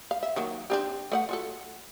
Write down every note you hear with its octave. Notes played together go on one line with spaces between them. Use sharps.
F5
E5
D#3 F#3 A#3
C4 D4 G4
A3 D5 F#5
F4 F#4 A4